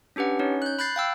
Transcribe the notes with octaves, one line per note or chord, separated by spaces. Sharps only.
C#4 D4 G4 B4 F#5
C#4 D#4 C#5
F#6 G6
B5 F#6 G6 A6 C7
F5 G5 E6